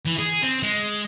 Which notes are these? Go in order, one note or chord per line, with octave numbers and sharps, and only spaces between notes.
E3
G#4
C4
G#3